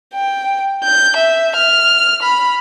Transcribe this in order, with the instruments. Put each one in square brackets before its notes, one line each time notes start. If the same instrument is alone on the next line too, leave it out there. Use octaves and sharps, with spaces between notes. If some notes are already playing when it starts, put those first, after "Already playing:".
[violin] G5
G6
E5
F6
B5